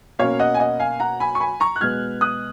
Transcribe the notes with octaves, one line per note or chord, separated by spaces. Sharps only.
B2 A#3 C#4 C#5 F5
D#5 F#5
G#5
D#5 F#5
F5 G#5
F#5 A#5
G#5 B5
C#6
G#5 B5
A#5 C#6
F#6
B2 G#3 B3 F6 G#6
D#6 F#6